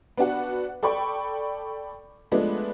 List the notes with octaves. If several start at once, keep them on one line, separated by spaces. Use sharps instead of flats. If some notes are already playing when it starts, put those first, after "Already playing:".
B3 D4 F#4 F#5
A4 D5 G5 B5 C#6
F3 G#3 A3 B3 D4